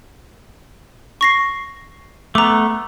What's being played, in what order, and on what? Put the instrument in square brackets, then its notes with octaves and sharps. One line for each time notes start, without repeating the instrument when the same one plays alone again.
[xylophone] C#6 A#6 C7
[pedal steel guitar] A3 B3 [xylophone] A#5 D6